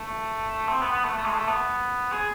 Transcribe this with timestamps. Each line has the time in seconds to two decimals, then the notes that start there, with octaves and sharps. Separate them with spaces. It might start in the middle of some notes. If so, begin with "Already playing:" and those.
Already playing: A3
0.69 C4
0.82 B3
0.92 B3
1.04 A3
1.16 A3
1.26 G#3
1.33 A3
1.49 B3
2.12 G#4